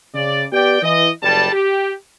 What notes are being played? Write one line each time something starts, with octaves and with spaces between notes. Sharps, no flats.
C#3 D5
B3 G4 D5 G5
E3 D#5
F#1 G3 A5
G4